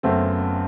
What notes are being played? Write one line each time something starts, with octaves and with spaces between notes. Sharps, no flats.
F#1 F#2 F#3 A3 B3 C4